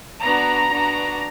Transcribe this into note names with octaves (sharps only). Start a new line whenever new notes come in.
B3 D4 F#4 A#5
B3 D4 F#4